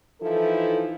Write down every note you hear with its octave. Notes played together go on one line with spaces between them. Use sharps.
E3 F3 D#4 E4 A4